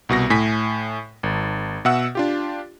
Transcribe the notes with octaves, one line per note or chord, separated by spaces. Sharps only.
C2 B2 F#4 A#6
A2 G#5 B6
G#1
B2 E5 F#5 E6
D4 F4 G4